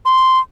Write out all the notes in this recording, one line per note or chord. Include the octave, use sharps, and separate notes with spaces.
C6